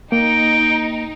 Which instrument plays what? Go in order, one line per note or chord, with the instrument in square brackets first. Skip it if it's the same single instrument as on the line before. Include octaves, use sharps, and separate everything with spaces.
[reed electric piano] A#3 [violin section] D#4 [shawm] G5